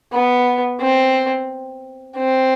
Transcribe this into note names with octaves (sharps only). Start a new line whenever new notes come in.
B3
C4
C4